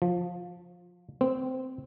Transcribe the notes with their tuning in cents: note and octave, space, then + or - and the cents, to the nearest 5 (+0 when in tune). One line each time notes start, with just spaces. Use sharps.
F3 +20
C4 -15